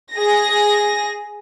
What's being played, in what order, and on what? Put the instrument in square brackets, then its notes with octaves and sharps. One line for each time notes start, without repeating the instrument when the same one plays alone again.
[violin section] G#4 A#6